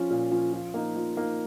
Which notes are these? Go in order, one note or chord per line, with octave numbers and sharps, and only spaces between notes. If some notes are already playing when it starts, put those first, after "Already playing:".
Already playing: F3 C#4
A#2
F3 C#4
F3
A#3 D#4
F3
A#3 D#4